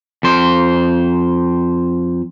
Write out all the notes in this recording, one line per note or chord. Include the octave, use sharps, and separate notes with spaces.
F2 C5